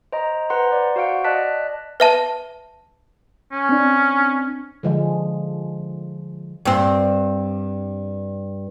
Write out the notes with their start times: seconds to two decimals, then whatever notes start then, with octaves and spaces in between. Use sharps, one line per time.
0.12 C5 D#5 A#5
0.50 B4 C5 F#5 A#5 C6
0.72 D5
0.96 F#4 C5 F5 F#5 D7
1.24 D5 D#5 A5 F#6 B6
2.00 B4 E5 A5
3.52 C#4
3.69 C4 D4
4.83 D3 F3 G#3
6.66 G2 C4